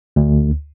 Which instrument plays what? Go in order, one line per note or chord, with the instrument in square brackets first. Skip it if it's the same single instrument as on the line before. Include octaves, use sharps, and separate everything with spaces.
[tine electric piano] D2